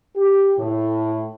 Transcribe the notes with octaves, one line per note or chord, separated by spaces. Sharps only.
G4
A2